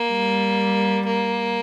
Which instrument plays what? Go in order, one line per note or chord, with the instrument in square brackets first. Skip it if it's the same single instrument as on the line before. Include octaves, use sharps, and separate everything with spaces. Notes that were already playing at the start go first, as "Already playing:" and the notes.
Already playing: [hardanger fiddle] A#3
[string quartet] G3
[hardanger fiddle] A#3